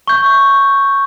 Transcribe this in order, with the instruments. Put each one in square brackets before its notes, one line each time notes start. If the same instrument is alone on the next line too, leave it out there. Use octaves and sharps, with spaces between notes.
[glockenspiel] C#6 G6